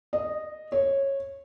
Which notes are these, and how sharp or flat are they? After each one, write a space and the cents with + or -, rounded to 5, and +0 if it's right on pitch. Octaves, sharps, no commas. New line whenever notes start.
D#5 -10
C#5 -15